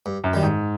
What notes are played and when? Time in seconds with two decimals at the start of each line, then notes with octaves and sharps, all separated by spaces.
0.06 G2
0.24 F#2
0.33 D#3 G3
0.43 G#2